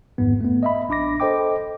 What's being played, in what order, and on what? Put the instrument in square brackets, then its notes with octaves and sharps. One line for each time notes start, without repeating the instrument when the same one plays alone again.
[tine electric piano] G#1 F2 G#2 B3
A3 B3
D#5 E5 B5
A#1 D4 B5 D6 A#6
A4 C5 D#5 G5 D6